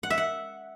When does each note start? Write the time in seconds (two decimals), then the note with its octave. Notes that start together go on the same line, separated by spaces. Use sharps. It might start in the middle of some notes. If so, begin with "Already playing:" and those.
0.03 F#5
0.10 E5
0.18 F#5